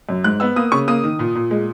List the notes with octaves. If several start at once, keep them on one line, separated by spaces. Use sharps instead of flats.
F#2
G#2 F#6
B3 E6
A#3 D#6
C#3 C#6
A#3 D#6
D#3
A#2
A#2
G#3